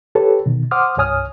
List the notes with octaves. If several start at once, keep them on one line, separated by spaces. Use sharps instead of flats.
G4 A4 B4 C#5
B2 D#3
C5 F#5 C6 D6 D#6 F6
C2 G2 C#5 G#5 D#6 F6